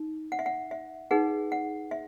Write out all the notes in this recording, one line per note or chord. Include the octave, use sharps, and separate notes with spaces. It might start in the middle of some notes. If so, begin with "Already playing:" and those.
Already playing: D#4
F#5
E5
F#5
E5
D#4 G#4 B4 F#5
F#5
E5